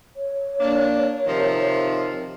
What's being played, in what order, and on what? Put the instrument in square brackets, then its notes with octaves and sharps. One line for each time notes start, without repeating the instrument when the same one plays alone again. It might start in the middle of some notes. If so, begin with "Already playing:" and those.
[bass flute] C#5
[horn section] A#3 D4
C3 D#3 F3